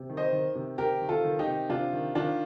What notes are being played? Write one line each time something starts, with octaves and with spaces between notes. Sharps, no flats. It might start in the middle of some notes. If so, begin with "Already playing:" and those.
Already playing: C3
D#3
C5 D#5
D#3
C3
C3 G4 A#4
D#3
F4 A4
D#3
D#4 G4
C3
C3 D4 F4
D#3
D#3 D4 F4